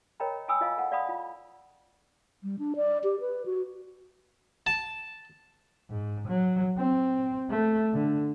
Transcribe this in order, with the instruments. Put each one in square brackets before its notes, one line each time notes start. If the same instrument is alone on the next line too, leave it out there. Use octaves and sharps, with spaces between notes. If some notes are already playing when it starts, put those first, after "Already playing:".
[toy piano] A#4 C#5 D#5 G5 A#5 B5
G5 G#5 B5 D#6 E6
F4 D#5 F5 G#5
A4 F#5
D5 F5 F#5 B5 D#6
F4
[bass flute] G3
D4
D5
G4
B4
F#4
[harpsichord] A5
[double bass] G#2
F#3
C4
A3
D3